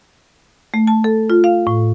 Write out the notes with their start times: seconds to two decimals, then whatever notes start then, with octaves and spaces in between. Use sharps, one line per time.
0.74 A3
0.87 A5
1.04 A4
1.30 F4
1.44 F5
1.67 A2